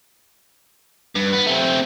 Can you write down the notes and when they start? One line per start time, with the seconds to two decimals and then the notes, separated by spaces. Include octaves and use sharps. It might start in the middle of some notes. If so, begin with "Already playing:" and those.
1.15 G2
1.33 B3
1.46 A3 C4